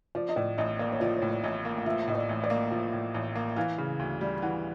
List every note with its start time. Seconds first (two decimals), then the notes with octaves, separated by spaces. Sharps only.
0.15 F3 D5
0.29 D#5
0.36 A2 D5
0.58 A1 D#5
0.79 A#3 D5
0.92 C#5
1.00 F3 D5
1.16 C#5
1.22 A2
1.30 D5
1.43 A1 D#5
1.65 A#3
1.78 F5
1.86 F3 E5
2.07 A2 D#5
2.15 D5
2.29 A1
2.44 D5
2.50 A#3
2.71 F3
2.93 A2
3.14 A1
3.36 A#3
3.56 E3 F5
3.78 C#3
3.99 D2
4.21 G3
4.42 E3 F#5